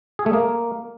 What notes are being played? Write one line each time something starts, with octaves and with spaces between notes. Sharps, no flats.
G#4
A3
A#3